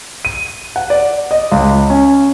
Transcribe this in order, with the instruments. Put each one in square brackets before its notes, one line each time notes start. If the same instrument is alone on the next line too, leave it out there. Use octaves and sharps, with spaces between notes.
[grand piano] D#7
F#5
D5
D#5
C#2
C#4